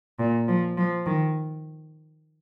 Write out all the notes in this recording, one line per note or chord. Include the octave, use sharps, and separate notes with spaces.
A#2
F3
F3
D#3